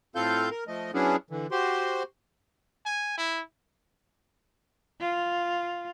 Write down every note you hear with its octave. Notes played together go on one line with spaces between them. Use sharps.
A2 C4 F4 A4 F5 G6
A#4
F3 A3 D#5
F#3 B3 C#4 D4 E4 G#4
D3 E3
F#4 G4 C5 C6
G#5
E4
F4